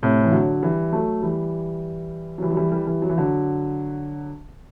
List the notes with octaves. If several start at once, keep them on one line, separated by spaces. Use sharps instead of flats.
A2 C3
E3
D3 F#3
E3 G3
F#3 A3
E3 G3
F#3
E3 G3
F#3
E3 G3
E3 G3
E3 G3
F#3
E3
D3 F#3